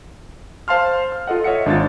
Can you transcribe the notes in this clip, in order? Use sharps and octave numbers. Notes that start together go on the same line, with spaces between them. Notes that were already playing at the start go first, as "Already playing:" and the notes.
C5 F5 A5 C6 F6
F6
F4 A4 D#5 F#5
C#5 D#5 E5 F#5 C#7
G#1 D4 F4 A6